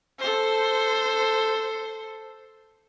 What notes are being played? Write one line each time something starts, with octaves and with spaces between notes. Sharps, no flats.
A4 C5